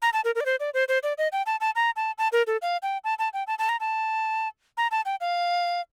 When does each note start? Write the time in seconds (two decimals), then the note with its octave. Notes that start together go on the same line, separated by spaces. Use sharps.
0.02 A#5
0.13 A5
0.25 A#4
0.35 A#4
0.41 D5
0.46 C5
0.60 D5
0.74 C5
0.88 C5
1.03 D5
1.18 D#5
1.32 G5
1.46 A5
1.61 A5
1.75 A#5
1.96 A5
2.18 A5
2.32 A#4
2.47 A4
2.62 F5
2.83 G5
3.04 A5
3.19 A5
3.33 G5
3.47 A5
3.59 A5
3.69 A#5
3.80 A5
4.77 A#5
4.91 A5
5.06 G5
5.21 F5